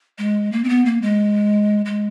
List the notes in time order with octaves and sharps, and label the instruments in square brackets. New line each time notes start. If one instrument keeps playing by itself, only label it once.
[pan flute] G#3
A#3
C4
B3
A#3
G#3
G#3